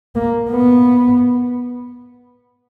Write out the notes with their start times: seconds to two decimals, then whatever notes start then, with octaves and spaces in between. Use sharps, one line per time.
0.15 A#3
0.51 B3